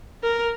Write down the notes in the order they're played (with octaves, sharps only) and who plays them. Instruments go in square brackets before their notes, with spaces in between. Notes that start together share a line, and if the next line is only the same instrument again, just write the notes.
[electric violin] A#4